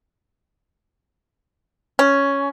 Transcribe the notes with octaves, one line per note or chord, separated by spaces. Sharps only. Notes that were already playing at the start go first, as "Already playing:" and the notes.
C#4